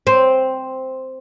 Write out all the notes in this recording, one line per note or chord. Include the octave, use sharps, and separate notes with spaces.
C4